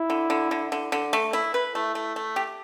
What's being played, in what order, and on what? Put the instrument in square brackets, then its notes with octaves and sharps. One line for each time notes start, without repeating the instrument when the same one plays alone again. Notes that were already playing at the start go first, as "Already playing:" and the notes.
Already playing: [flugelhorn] E4
[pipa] D3
D3
D3
D3
D3
A3
E4
B4
[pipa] A3 [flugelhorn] E4
[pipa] A3
A3
G4